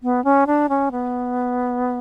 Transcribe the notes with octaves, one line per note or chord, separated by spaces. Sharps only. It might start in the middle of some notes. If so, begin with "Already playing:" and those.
B3
C#4
D4
C#4
B3